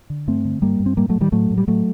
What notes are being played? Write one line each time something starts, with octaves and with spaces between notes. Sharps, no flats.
D3
G2 A3 C4
D3
G2 G3 A#3
G2
C4
A2 G3 A#3
F#3 A3
A2
D#3 G3
A2 F#3 A3
A2
G3
A2 F#3 A3